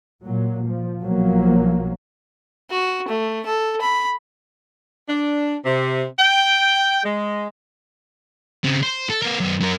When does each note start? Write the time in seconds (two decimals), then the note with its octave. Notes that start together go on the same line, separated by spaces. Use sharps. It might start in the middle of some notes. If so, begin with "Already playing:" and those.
0.24 A#2 F#3
0.68 F3
1.03 B1 F3 F#3 A#3
2.71 F#4
3.08 A3
3.46 A4
3.81 B5
5.08 D4
5.64 C3
6.19 G5
7.04 G#3
8.64 C#3 C4
8.83 C5
9.10 A4
9.22 B3 A#4
9.40 F#2 B3
9.60 F#2 A#4